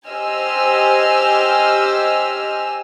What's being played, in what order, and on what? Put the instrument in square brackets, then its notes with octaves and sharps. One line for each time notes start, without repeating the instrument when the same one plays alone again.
[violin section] G4 C5 D#5 G#5 E6 F6